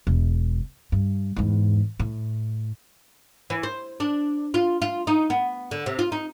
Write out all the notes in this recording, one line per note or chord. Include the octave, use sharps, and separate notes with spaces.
E1
G2
E2 G#2
A2
E3
C5
D4
F4
F4
D#4
B3
D3
C3
F4
D#4